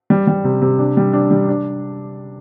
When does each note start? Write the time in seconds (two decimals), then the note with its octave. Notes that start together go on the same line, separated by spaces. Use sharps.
0.10 G3
0.27 G3
0.44 C3
0.62 C3
0.79 D4
0.97 G3
1.13 D4
1.31 G3
1.49 D4